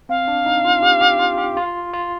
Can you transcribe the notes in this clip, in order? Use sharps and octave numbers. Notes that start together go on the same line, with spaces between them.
C4 F5
D4
D#4
F4
G4
G4
F4
G4
F4
F4